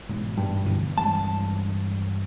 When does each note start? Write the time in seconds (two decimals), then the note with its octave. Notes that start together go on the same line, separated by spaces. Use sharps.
0.09 G#2 B2 E3
0.38 G2
0.65 G1 B2 E3
0.98 G2 E3 G#3 A5